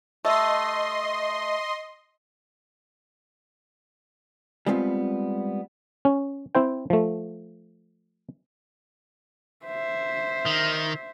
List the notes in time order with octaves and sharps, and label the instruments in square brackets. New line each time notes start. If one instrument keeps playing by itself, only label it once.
[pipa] G3 A3 [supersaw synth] D#5 C6
[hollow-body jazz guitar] G3 G#3 B3 C4 F4
[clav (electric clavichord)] C#4
C4 E4 C5 G5
F3 A3
[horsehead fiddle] C5 E5
[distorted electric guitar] D#3